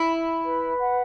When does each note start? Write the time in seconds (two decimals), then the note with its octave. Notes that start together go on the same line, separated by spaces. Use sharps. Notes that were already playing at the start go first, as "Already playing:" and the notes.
Already playing: E4
0.12 B5
0.46 B4
0.79 F#5